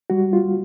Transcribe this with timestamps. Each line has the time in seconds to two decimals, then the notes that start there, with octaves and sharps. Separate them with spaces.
0.10 G3 F#4
0.33 F4